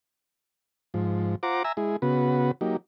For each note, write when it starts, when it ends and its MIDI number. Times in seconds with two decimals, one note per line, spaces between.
0.94 1.35 44
0.94 1.35 53
1.43 1.63 65
1.43 1.63 72
1.43 1.63 78
1.43 1.63 82
1.43 1.63 86
1.64 1.72 76
1.64 1.72 80
1.64 1.72 82
1.64 1.72 88
1.77 1.96 56
1.77 1.96 64
1.77 1.96 68
2.02 2.51 49
2.02 2.51 59
2.02 2.51 66
2.02 2.51 71
2.61 2.77 54
2.61 2.77 58
2.61 2.77 63
2.61 2.77 67